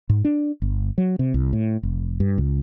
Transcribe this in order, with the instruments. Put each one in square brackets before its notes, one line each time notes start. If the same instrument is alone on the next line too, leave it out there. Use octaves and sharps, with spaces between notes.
[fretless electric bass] G#2
D4
G1
F#3
C3
C2
A2
F1
G2
C#2